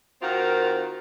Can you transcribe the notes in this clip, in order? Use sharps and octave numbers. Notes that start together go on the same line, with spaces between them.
D#3 C4 F4 F#4 A#4